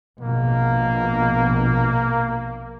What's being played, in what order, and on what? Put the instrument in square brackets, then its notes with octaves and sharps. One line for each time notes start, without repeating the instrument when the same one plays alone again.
[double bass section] A#1 B2 [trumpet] A#3